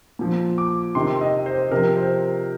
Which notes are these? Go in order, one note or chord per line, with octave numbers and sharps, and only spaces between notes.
A#2 F3
D6
C3 D#3 C6
D#5
C5
C3 F3 A#4
C5